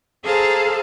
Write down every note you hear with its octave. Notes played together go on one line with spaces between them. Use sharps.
G#4 A4 C5 F5 A5 A#5